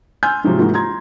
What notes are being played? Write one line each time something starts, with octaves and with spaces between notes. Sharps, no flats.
G#5 C6 E6 F6 G6
G#2 C3 F3 F#3
G#2 E3 A#3 F4 F#4
A#5 C6 G#6